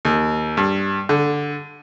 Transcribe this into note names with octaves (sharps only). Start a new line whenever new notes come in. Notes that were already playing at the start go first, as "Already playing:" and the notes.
D#2
G2
D3